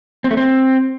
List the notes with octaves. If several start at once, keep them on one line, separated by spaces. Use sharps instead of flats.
C4
A3
C4